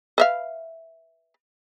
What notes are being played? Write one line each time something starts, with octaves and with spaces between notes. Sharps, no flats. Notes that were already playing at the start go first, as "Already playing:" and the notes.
B4 E5 F5